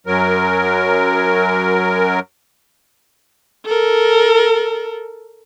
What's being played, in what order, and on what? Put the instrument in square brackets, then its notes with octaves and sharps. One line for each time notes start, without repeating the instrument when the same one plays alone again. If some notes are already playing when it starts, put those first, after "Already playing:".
[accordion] F#2 F#3 A#4
[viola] A4 A#4